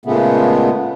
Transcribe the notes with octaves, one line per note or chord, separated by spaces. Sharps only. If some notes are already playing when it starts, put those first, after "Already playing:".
A#2 C#3 G#3 A3 B3